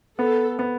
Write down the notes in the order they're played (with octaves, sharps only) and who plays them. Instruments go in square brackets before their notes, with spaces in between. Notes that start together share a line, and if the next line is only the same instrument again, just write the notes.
[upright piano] B3 [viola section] A4
[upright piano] B3